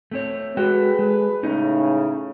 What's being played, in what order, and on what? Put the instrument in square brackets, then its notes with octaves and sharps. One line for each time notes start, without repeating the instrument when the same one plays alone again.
[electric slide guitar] A3 C4 C#5
[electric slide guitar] G#3 F#4 G5 [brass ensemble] G#4 A4 B4
[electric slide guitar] G#3
[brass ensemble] A2 C#3 [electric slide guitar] C#4 D#4